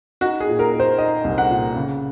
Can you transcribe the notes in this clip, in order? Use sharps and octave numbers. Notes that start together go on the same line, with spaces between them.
D#4 F#4
G#4
A#2
A#4
D#4
C5
D#4 D#5
C2
F#5
A#2
C#3